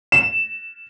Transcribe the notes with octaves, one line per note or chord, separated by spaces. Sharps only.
E7